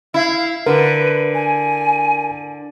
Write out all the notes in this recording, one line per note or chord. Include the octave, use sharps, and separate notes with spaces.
E4 F5
D3 A#4 B4
G#5